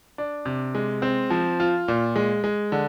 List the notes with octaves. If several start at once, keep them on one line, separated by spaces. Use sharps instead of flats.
D4
C3
G#3
C4
F3
F4
A#2
G#3
G#3
D3